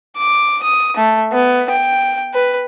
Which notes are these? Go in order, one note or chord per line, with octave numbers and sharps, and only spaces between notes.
D6
D#6
A3
B3
G5
B4